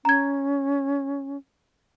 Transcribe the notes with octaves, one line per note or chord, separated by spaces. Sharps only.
C#4 A#5 G#6